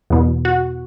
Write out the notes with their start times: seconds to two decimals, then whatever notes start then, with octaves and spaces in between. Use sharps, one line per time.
0.10 E2 B2
0.45 F#4